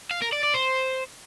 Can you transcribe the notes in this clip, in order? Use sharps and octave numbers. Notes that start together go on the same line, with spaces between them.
F5
A#4
D5
D5
C5